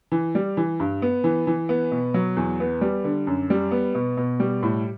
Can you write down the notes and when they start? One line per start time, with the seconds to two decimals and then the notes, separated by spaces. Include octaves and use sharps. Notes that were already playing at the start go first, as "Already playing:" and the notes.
0.12 E3
0.35 G3
0.57 E3
0.80 G2
1.02 B3
1.24 E3
1.47 E3
1.69 B3
1.91 B2
2.14 F#3
2.36 E2
2.60 B3
2.81 G3
3.04 D3
3.27 F#2
3.50 G3
3.71 B3
3.95 B2
4.17 B2
4.40 G3
4.63 A2